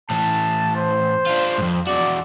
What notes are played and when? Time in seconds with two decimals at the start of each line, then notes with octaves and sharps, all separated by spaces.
0.10 A2 E3 A5
0.76 C5
1.26 D4 F4
1.58 F2 G#2
1.87 E2 F#4 D5